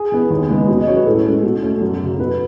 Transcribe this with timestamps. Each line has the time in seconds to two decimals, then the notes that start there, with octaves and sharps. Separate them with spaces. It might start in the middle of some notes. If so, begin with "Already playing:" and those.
Already playing: G#4
0.12 E3 B3
0.30 D#2
0.49 C#3 G#3 B3
0.68 B2
0.77 D#5
0.87 F#3 C#4 C#5
0.96 B4
1.06 A2 A4
1.25 G#3 C#4
1.43 B2
1.62 A3 C#4
1.81 F#2
2.00 C#3 F#3
2.19 B2 B4